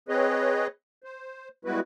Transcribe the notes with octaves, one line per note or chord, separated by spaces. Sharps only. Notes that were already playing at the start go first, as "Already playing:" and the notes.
C4 G#4 B4 C#5 D#5
C5
G3 G#3 B3 E4 F#4 B4